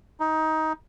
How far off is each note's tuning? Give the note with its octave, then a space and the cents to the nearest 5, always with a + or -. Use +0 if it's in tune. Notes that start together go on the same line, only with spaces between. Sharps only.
D#4 +15